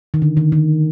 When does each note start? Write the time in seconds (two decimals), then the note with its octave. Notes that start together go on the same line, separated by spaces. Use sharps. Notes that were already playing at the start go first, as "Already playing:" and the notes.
0.14 D#3
0.22 D3
0.37 D#3
0.52 D#3